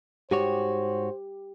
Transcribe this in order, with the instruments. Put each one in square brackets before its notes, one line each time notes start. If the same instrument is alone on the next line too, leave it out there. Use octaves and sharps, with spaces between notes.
[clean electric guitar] G#2 F#4 C#5 [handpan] G4 [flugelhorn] C5